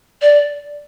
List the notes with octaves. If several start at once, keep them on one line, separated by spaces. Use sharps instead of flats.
D5